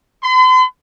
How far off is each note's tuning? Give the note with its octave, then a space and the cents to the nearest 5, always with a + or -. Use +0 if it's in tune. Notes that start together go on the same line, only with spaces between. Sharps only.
C6 -45